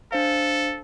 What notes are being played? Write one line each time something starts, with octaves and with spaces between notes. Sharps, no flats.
D4 A4 C5 F5